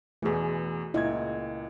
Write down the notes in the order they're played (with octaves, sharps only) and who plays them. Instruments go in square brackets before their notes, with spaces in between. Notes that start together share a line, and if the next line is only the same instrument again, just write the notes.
[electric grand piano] E2 B2 E3 [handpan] A3 G#4
[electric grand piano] C#2 A#2 G#6 [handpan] E4 D#5